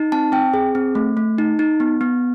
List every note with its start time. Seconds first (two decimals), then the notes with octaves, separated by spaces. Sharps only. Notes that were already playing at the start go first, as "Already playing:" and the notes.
Already playing: D#4
0.12 C4 A5
0.32 C4 G5
0.54 G#4
0.75 C4
0.95 A3
1.17 A3
1.38 D#4
1.59 D#4
1.80 B3
2.01 B3